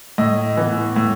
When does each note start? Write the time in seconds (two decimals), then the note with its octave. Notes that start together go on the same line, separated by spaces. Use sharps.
0.18 A2 D#5
0.57 E3 B3
0.96 A2